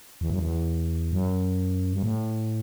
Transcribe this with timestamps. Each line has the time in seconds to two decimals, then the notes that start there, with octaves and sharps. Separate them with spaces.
0.21 E2
0.30 F#2
0.39 E2
1.12 F#2
1.93 G2
2.03 A2